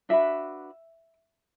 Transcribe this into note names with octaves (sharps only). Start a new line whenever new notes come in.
D4 F#4 B4 E5